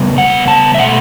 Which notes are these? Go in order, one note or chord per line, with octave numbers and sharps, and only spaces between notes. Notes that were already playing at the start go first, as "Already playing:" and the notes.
Already playing: C#3 G3 B3
F#5
A5
E5
B2 A3 F#5